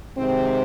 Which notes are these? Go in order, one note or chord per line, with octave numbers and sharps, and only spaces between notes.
G#2 C3 D#3 G#3 C4